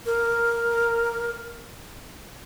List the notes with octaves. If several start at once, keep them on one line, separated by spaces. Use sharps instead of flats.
A#4